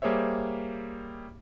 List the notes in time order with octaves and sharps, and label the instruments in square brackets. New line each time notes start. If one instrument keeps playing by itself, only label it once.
[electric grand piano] G3 A#3 G#4 C5 C#5 E5